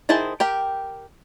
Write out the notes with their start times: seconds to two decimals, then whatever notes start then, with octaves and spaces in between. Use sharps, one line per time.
0.09 D#3 E4 G#4 C5 A5
0.40 G4 A#4 G5